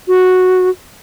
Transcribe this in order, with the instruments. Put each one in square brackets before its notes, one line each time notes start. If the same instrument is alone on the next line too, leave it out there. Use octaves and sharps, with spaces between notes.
[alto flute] F#4